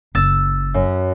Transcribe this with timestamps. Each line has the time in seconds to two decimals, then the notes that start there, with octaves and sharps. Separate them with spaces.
0.15 F#1 E6 A6
0.74 F#2